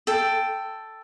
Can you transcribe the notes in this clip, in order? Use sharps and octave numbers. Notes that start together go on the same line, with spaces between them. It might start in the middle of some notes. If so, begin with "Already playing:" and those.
A4 G5